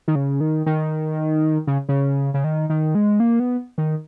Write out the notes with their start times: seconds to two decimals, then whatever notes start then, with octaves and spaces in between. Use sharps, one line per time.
0.08 D#3
0.15 C#3
0.40 D#3
0.66 D#3
1.67 C#3
1.89 C#3
2.34 C#3
2.44 D#3
2.70 D#3
2.95 G#3
3.20 A#3
3.40 B3
3.78 D#3